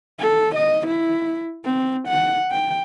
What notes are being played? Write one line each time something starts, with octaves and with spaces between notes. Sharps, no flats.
A4
D#5
E4
C4
F#5
G5